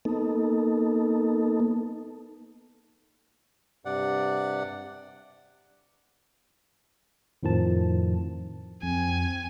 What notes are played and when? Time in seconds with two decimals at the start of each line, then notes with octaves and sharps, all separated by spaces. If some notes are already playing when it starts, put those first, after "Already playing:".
0.05 A#3 B3 D#4 A4
3.85 G2 C3 D5 F#5
7.43 F2 A2 D#3 F3 A5
8.83 F2 C4 G#5